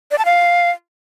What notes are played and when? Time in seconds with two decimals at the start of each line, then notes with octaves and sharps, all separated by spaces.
0.11 D5
0.18 A5
0.25 F5